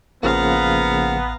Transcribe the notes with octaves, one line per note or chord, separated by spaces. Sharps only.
A1 C#3 F3 A#3 B3 F5 A#5